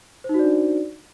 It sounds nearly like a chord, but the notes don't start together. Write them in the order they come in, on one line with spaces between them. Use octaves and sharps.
C5 D#4 F#4 D5 D4